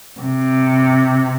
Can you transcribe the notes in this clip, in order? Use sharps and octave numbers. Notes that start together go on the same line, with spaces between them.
C3